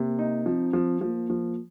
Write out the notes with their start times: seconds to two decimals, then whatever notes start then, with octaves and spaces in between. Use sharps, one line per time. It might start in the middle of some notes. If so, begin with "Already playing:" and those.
Already playing: C3 A#3
0.19 D#4
0.46 F3 C4
0.73 F3
1.01 F3 A#3
1.30 F3